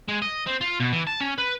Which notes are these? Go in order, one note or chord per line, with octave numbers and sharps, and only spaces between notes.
G#3
D#5
C4
F4
B2
E3
A5
C#4
B4